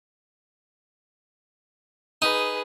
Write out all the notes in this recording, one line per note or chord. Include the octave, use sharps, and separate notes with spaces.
D#4 G#4 B4